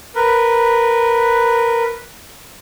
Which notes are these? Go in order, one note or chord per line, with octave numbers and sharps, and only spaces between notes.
A#4 B4